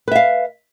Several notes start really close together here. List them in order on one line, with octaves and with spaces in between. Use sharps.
B4 E5 F5